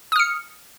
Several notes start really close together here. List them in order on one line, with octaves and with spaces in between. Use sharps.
D#6 F6 C#7